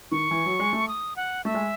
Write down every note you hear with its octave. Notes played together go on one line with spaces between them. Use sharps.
D#3 C#6
E3
F#3
G#3
A3
D#6
F#5
A3 E5
G#3